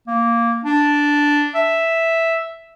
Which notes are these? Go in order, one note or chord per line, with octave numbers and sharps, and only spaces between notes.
A#3
D4
E5